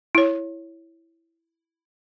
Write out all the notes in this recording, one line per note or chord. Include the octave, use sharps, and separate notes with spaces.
E4 C#5